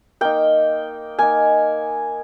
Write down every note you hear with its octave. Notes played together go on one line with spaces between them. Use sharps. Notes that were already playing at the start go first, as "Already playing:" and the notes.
A#3 D#4 G5
A#3 D#4 G#5